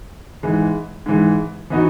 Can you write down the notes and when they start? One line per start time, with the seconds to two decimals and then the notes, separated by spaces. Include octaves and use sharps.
0.43 G#2 E3 G#3
1.06 G#2 E3 G#3
1.70 E3 B3 D#4 F#4